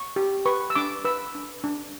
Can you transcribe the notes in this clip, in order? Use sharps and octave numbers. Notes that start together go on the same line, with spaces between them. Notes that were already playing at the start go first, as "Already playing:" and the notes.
Already playing: C#6
G4
B4 C#6
E6
D4 D6
B4 E6
D4
D4